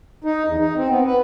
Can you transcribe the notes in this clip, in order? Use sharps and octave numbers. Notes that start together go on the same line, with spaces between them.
D#4
E2
D#4
C4
B3
B4